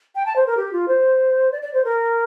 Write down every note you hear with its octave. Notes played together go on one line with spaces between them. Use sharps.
G5
A5
C5
A#4
G4
F4
C5
D5
D5
C5
A#4